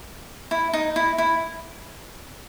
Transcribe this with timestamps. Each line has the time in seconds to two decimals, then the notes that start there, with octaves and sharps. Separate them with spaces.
0.51 E4
0.73 D#4
0.96 E4
1.18 E4